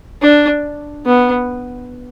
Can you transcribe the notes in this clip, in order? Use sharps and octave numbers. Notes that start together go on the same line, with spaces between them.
D4
B3